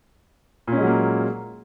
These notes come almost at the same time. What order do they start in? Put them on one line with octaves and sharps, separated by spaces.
A#2 C#4 G#3 F#3 A#3